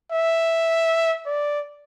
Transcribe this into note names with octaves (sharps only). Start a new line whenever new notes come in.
E5
D5